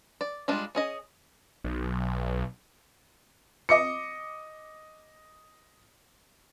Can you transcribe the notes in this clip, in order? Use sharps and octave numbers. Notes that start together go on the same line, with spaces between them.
D5
G3 G#3 D4 F4
C#4 G#4 D#5
B1
D#5 D6 C#7